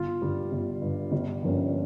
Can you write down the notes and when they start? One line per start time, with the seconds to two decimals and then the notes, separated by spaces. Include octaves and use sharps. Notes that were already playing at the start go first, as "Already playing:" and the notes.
Already playing: G1 F4
0.21 G2 D3 G3
0.52 G1
0.82 G2 D3
1.12 G1 G3
1.43 G2 F3 A#3 C#4